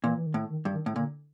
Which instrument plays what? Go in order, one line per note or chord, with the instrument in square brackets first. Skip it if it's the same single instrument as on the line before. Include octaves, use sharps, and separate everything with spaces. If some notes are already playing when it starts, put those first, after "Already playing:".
[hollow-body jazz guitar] A#2 [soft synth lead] E3
[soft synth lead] E3
D#3
[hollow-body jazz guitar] A2
[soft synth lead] D#3
[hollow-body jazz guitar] G2
[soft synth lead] D#3
[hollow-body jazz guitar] A2
[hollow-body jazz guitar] A#2 [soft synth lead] D3